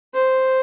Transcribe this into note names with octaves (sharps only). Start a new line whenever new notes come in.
C5